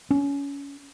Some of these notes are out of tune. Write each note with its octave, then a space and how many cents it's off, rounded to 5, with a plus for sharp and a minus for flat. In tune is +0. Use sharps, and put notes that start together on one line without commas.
C#4 +25